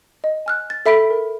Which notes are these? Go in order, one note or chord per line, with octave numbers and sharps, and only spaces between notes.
D#5
G#5 F6 F#6
A6
A4 E5 B5 B6 D7
A#4